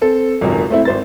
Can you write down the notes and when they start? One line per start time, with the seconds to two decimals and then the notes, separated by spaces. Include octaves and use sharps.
0.02 C4 A4
0.41 G#1 C#2 F#2 D#3
0.70 A3 C4 E4
0.85 G#1 C5 A6